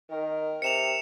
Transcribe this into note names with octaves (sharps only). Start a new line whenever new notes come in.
D#3 A#4
C3 C#7 E7 F7